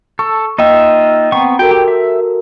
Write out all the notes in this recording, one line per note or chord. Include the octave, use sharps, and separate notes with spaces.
A4 C#6
A#3 D#4 F4 D#5 E5 G5
B3 C4 G5 A#5 C#6
F#4 A4 A#4 G5
G4
E5